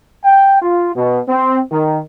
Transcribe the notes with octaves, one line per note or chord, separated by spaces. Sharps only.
G5
F4
B2
C4
D#3